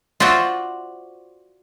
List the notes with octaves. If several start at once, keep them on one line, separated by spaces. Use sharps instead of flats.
F4 F#4 C5 D5 E5 F#5